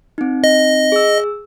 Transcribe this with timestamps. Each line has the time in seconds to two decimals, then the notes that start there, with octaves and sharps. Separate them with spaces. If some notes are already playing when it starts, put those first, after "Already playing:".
0.18 C4 D#4
0.44 D#5
0.92 G#4 E6